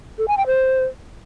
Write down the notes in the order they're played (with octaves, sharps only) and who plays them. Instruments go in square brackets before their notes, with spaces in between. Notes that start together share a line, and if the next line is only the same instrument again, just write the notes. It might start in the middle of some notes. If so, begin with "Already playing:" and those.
[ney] A4
G#5
G5
C5